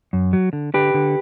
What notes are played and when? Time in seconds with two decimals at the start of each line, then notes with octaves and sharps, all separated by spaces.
0.13 F#2
0.33 F#3
0.53 D3
0.74 D3 G4 B4
0.94 D3